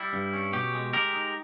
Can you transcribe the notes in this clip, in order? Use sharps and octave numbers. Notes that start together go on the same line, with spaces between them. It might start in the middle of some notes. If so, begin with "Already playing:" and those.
Already playing: G3 E4
G2
C#4
B2 G4
G#3
G#3 G4 A#4
D#4